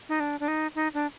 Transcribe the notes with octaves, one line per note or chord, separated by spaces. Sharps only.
D#4
D4
D4
D#4
D#4
D4